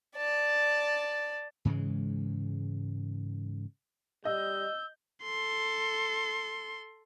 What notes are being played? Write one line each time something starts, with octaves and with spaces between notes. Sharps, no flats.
D5 A5
G#2 C#3 E3 G#3
G3 D#5 E6 G6
A4 C6